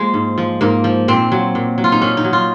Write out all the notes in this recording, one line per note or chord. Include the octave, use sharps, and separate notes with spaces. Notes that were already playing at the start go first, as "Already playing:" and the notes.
Already playing: F3 G#3 A#3
G#2
F3
G#2 A#3
F3
A#2 C4
F#3
A#2
F#3
F4
D#4
A#2 C#4
D#4
F#3
F4